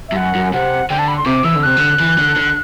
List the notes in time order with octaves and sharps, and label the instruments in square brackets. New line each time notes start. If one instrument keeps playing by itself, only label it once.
[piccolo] E5
[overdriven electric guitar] G2
[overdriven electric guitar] F#2 [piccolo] F#5
[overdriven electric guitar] F#2
[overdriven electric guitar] C3 [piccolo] F#5
[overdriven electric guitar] D3 [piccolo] G5
[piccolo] A5
B5
C6
[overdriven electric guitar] C3 [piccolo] D6
[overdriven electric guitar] E3 [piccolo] E6
[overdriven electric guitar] D3
[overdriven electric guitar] C3 [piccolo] F#6
[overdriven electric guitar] D3
E3
D3
D3